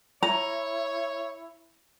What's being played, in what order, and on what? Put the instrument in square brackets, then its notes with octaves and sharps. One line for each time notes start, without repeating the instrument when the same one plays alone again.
[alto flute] E4 [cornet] C#5 [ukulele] A#5